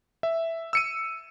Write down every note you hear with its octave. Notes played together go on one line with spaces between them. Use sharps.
E5
E6 C#7 D#7